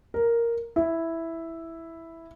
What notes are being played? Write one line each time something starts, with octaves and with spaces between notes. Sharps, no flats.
A#4
E4